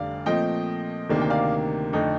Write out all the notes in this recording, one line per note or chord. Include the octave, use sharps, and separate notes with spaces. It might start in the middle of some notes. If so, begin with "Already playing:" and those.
Already playing: F1 F2 D3 G3 D5 F5
A#2 F3 A3 C4 D#5 G5
D2 C3 D#3 A#3 D4
G5
D5 F5
F2 D3 A3 D#4